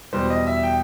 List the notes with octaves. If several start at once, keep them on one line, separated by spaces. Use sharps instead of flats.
E2 B2 G3 C5
D#5
E5
G5